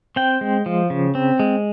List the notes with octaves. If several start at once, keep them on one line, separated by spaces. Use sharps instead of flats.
C4 G5
G#3
F3
C#3
C4
G#3